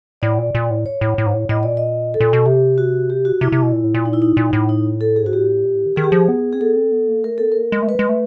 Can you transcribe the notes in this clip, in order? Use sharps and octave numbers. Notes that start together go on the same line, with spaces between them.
A2 D5
A#2
A#2
A2
C#5
A2
A2
G#2
A2
A2 D#5
A#2 D5
D#5
A4
A#2
B2
C3 G4
F#4
G4
F#4
C3 E4
C3
B2
A#2
A2
A#2
D#4
E4
D#4
A#2
A2
D#4
A4
G#4
G#2 F#4
A2 G4
A#2
A2
D#3
D#3 G#4
G4
F3 G#4
B3
C4 G#4
B3 A4
C4
B3
A#3
A3 A#4
B3 A4
A#4
A#3
G#3
A3
G#3 B4
G#3
A3